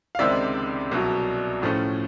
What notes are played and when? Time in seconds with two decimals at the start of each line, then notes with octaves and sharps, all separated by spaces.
0.15 F5
0.19 C#2 C3 D#3 G#3 C4 D5 E5
0.92 C2 B2 F#3
1.62 A2 F3 A3 C#4